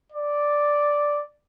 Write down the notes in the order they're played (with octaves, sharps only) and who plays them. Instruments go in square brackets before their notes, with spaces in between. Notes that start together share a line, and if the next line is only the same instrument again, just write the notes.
[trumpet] D5